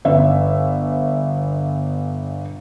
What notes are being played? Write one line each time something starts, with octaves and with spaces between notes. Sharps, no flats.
G1 E5